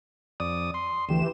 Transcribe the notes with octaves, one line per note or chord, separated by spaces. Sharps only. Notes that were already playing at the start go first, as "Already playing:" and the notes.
F2 D5 D#6
C6
D2 E3 G4 E7